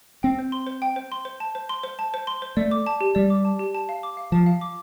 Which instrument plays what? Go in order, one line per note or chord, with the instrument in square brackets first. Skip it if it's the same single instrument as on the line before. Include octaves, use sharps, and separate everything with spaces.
[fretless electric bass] C4 [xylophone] G5
[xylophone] C5
C6
C5
G5
C5
C6
C5
A5
C5
C6
C5
A5
C5
C6
C5
[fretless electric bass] A3 [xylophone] D5
[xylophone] D6
A5
G4
[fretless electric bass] G3 [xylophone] D5
[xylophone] D6
A5
G4
A5
F5
D6
F5
[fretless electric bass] F3 [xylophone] A5
[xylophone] F5
D6